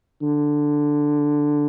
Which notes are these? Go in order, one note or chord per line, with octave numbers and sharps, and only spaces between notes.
D3